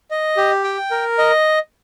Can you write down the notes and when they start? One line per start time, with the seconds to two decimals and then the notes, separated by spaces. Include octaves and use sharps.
0.11 D#5
0.37 G4
0.64 G5
0.91 A#4
1.18 D#5